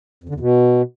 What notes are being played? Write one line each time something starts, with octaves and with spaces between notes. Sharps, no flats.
F2
D3
E2
B2